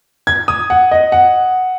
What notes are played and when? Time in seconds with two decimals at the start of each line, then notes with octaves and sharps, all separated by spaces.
0.27 G#6
0.48 D#6
0.70 F#5
0.92 D#5
1.12 F#5